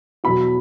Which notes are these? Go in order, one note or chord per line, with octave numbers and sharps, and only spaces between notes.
E2 B2 F#3 B5